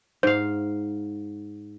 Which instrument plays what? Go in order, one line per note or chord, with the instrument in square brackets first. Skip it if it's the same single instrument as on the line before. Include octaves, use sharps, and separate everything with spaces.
[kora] G#2 F5 [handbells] C5